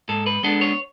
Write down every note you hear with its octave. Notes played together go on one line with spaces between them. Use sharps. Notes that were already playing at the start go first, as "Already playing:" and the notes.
G#2 A4
B4
G#3 B3 D4 A4
C#5